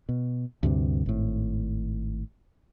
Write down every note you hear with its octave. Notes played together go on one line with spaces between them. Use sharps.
B2
D2 G2 C3
G#1 A2